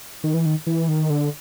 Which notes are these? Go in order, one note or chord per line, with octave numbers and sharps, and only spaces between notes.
D#3
E3
D#3
E3
D#3
D3